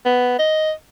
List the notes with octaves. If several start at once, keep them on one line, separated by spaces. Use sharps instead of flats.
B3
D#5